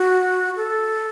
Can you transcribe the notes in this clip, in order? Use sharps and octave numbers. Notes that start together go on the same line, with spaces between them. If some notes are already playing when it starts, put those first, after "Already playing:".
Already playing: F#4
A4